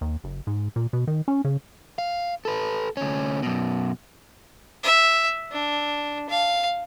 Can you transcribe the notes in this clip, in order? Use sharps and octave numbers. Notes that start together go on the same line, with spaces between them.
D#2
F#1
G#2
A#2
B2
D#3
C#4
C#3
F5
A4 B4
D2 C#4
F#2 B2
E5
D4
F5